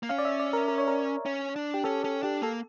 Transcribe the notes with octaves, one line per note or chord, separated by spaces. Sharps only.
A#3
C#4 F5
D5
E5
D5
A#4
A#4
C#5
A#4
C#4
D4
G4
C#4 A4
C#4 A4
D4 G4
A#3 A4